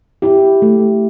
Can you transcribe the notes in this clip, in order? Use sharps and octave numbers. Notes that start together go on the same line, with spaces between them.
E4 G4
A3